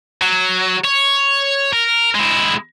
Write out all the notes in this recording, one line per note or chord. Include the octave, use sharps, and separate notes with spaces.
F#3
C#5
A#4
G#3 E4